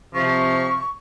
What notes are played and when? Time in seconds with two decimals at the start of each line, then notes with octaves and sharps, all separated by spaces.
0.15 C3 F3 C#6